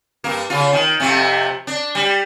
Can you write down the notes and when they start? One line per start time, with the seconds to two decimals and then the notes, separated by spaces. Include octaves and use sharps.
0.24 G2 A#3
0.50 C#3 F4
0.73 D#3
1.00 F2 C3 A3
1.67 D4
1.95 G3